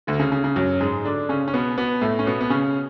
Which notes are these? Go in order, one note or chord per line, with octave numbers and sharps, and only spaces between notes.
D2 D3
C#3
C#3
C#3
F#2 F#3
G#2 G#3
D3 D4
C#3 C#4
C#4
B2 B3
B2 B3
A2 A3
C#4
B2 B3
B3
C#3 C#4